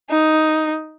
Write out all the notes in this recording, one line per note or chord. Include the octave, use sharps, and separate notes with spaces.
D#4